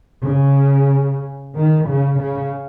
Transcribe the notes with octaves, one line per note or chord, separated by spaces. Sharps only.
C#3
D#3
C#3
C#3